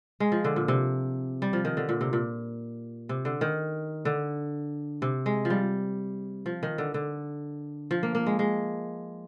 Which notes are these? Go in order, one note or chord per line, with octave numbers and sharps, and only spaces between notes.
G#3
F3
D3
A#2
C3
G3
F3
D#3
D3
A#2
C3
A#2
C3
D3
D#3
D3
C3
G#3
F3
G3
F3
D#3
D3
D3
F3
A#3
A#3
G#3
G#3